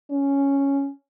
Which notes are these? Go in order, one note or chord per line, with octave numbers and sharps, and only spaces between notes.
C#4